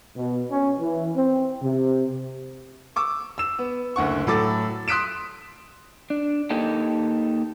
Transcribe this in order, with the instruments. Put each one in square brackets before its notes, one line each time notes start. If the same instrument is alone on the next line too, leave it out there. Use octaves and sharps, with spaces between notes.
[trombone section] B2
C#4
E3
C4
C3
[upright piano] C#6 D6 E6
E6 E7
B3
F#1 D2 F#5 C#6
A2 F#3 A4 D6 A6
C6 D#6 F#6 B6 D7 E7
[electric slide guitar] D4
A#3 D#4 G4 A4